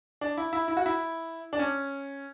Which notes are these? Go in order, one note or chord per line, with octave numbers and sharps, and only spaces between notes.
D4
E4
E4
E4
F#4
E4
D4
C#4